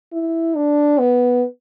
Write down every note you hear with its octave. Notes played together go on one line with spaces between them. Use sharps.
E4
D4
B3